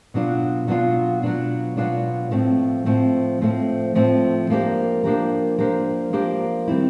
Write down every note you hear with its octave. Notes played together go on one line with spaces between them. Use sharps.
B2 F#3 B3 D4 F4
B2 F#3 B3 D4 F4
B2 F#3 B3 D4 F4
B2 F#3 B3 D4 F4
A2 F3 A3 C4
A2 F3 A3 C4
A2 F3 A3 C4
A2 F3 A3 C4
F3 A#3 D4 G4 A#4
F3 A#3 D4 G4 A#4
F3 A#3 D4 G4 A#4
F3 A#3 D4 G4 A#4
D#3 G3 C4 E4